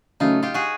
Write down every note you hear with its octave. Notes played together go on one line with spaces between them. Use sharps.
C#3 F#3 A3 C#4 D#4 F4
F4 G4
F#4 G#4